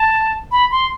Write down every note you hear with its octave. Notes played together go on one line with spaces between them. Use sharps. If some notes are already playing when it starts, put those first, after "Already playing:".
Already playing: A5
B5
C6